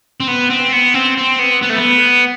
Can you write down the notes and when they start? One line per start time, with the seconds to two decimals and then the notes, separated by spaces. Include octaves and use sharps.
0.20 C4
0.28 B3
0.50 C4
0.73 B3
0.94 C4
1.17 C4
1.39 B3
1.62 B3
1.70 A3
1.76 B3